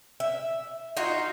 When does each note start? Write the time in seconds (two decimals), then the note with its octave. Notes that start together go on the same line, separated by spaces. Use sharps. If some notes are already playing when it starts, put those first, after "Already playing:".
0.20 E5
0.97 D#4 F4 F#4